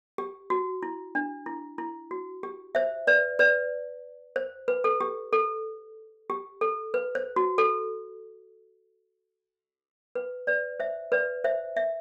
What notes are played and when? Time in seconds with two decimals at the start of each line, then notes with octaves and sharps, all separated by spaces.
0.18 G4
0.50 F#4
0.83 E4
1.15 D4
1.46 E4
1.78 E4
2.11 F#4
2.43 G4
2.75 C5 E5
3.07 B4 D5
3.39 B4 D5
4.36 C5
4.68 B4
4.84 A4
5.01 G4
5.33 A4
6.30 G4
6.61 A4
6.94 B4
7.15 C5
7.36 F#4
7.58 A4
10.15 B4
10.47 B4 D5
10.80 C5 E5
11.12 B4 D5
11.44 C5 E5
11.76 E5